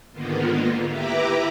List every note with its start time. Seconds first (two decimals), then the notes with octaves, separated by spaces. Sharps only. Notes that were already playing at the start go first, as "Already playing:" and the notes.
0.13 G#2 D3 D#3 A#3 B3 F4
0.88 E4 G4 B4 E5 A#5 D6